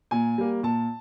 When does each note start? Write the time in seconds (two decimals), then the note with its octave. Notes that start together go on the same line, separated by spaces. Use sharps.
0.11 A#2 G#5
0.38 G3 A#3
0.63 A#2 A5